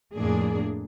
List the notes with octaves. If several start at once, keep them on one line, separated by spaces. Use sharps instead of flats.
F2 A2 A#3 D4 G#4